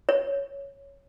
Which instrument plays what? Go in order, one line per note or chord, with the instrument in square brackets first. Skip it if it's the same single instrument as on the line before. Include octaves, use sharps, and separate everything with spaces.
[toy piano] C#5